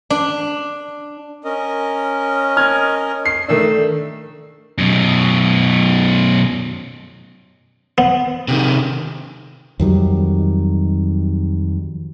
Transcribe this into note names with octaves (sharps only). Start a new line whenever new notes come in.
D4
C#4 A#4 D#5
F6 G#6
C7
D#3 A3 D4 E6
F#2 B2
B3
C3 D#3
F2 D#3 F#3 G3